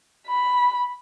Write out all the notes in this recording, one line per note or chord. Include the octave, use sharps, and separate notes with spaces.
B5